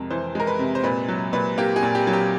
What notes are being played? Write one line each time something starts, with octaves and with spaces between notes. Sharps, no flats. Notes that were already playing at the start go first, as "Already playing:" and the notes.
Already playing: F2 C3 G#3 A#4
E3 C5
G#3 A#4
B4
C3
C5
A#2 B4
F#3
A#2 B4
A#3 G4
G#4
A#2
G4
F#3
G4